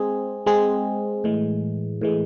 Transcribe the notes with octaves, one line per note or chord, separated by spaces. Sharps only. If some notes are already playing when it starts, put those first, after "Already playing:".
Already playing: G#3 C4 G#4
G#3 C4 G#4
A2 E3 G#3
A2 E3 G#3